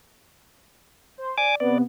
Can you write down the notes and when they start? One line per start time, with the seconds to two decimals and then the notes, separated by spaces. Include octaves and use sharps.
1.18 C5
1.38 D5 G#5 D6
1.60 C3 B3 D5